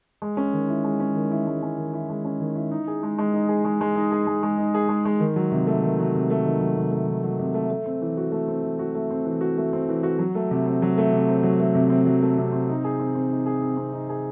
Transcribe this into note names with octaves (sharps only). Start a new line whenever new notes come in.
G#3
C#4
D#3
E4
G#3
C#4
D#3
E4
G#3
C#4
D#3
E4
G#3
C#4
D#3
E4
D#4
G#4
G#3
G#3
D#4
G#4
G#3
G#3
D#4
G#4
G#3
G#3
D#4
G#4
G#3
G#3
D#3
F#3
C3
A3
D#3
F#3
C3
A3
D#3
F#3
C3
A3
D#3
F#3
C3
A3
A3
C4
E3
F#4
A3
C4
E3
F#4
A3
C4
E3
F#4
A3
C4
E3
F#4
F#3
A3
C3
C4
F#3
A3
C3
C4
F#3
A3
C3
C4
F#3
A3
C3
C4
D#4
G#4
C4
C4
D#4
G#4
C4
C4
D#4
G#4